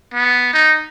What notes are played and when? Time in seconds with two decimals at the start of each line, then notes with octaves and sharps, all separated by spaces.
0.14 B3
0.53 D#4